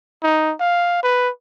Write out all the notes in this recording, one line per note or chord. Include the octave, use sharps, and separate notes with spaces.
D#4
F5
B4